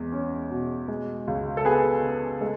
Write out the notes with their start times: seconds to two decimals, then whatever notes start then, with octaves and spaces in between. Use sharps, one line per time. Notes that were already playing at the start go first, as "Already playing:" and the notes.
Already playing: E2 G#3
0.12 C#4
0.51 B2
0.88 G#3
1.27 C#2
1.57 A4
1.65 B3 G#4 B4
2.03 C#3
2.41 G#3 A4